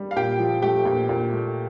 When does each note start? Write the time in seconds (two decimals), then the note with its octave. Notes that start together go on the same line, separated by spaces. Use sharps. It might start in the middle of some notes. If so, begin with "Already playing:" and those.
Already playing: G3
0.11 F5
0.16 A#2 G4 G5
0.39 F3
0.62 A3 G4 G5
0.85 A#2
1.09 A#2
1.32 A3